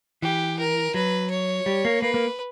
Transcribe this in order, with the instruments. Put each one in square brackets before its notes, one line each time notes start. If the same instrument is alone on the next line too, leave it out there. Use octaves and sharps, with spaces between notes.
[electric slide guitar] E3 [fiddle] G4
[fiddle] A#4
[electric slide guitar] F#3 [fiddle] B4
[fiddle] C#5
[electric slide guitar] G3
A#3
[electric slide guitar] A#3 [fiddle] B4
[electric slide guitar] A#3